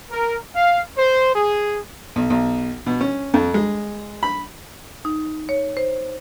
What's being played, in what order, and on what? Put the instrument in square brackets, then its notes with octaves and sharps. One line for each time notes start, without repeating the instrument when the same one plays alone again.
[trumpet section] A#4
F5
C5
G#4
[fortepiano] B1
B1
B2
C#4
F2
G#3
B5
[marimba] D#4
C#5
C5